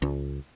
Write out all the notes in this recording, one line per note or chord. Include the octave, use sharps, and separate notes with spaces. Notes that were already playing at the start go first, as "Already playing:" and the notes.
C#2